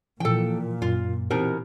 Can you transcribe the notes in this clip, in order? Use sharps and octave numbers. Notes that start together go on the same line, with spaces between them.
A#2 E3 F3 A4 G5
F#2 F4
B2 E3 C4 D#4 G4 A#4